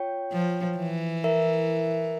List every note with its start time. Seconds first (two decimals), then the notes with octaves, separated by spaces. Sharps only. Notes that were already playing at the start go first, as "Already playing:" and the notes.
Already playing: F4 C#5 G5
0.32 F3
0.78 E3
1.24 E4 A#4 E5